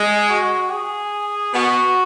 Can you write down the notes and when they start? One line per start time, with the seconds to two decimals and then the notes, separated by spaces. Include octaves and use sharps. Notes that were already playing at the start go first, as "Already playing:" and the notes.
Already playing: G#3
0.29 F#4
0.72 G#4
1.54 B2 B3 F#4